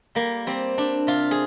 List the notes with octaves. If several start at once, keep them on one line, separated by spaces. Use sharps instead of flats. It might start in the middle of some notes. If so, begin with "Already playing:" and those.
G3 A#3
G3 C4
G3 D4
C3 F4
G#4